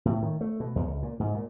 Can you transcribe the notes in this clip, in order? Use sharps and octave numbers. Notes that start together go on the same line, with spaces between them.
A2
D#3
A3
B2
E2
C#2
A#2
G#2
A#2